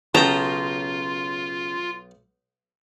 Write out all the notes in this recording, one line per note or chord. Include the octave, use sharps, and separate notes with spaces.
B1 C#3 F4 G5 A5 A#5